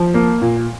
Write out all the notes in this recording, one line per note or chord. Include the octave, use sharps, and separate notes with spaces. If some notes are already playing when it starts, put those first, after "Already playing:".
Already playing: F3
A#3
A#2